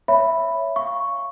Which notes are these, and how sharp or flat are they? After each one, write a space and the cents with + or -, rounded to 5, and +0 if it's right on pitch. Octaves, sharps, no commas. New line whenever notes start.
C#5 +0 E5 +10 B5 +0
F5 -10 C#6 +0